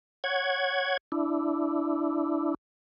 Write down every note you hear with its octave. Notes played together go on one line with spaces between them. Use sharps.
C#5 F#5 G#6
D4 E4